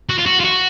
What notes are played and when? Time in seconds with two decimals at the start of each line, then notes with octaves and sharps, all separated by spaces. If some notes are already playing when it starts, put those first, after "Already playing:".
0.09 F#4
0.18 F4
0.26 F#4
0.40 F4
0.45 F#4